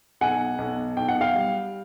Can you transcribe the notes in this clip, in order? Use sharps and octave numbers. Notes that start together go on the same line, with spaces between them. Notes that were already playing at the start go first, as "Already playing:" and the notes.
B1 F#5 G#5
B1
B1 G5
F#5
F5 G5
G3